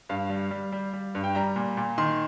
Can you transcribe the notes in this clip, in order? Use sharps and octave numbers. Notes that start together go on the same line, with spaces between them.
G2 F5
G3
G3
G3
G3
G2
G5
G3 A#5
A#2
A#2
D#3 C6